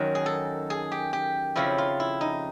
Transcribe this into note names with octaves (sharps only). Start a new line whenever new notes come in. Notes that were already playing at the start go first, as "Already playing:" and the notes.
Already playing: F#2 D#3 F#3
G#4
A4
G#4
G4
G4
F2 C#3 F3 E4
F4
E4
D#4